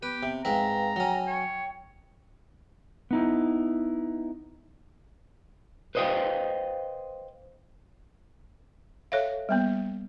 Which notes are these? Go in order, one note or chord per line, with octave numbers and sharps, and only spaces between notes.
B3 G4 B4
C3
G#2 C4 B4 F5 G5 A#5
F#3 C#4 G5
C#5
B3 D#4 E4
B4 C5 D#5 F5 G5
A4 C#5 E5 F5
G3 A#3 B3